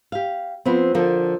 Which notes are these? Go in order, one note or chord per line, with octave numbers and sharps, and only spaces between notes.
G4 F5
F3 B3 C4
D3 F3 A4 A#4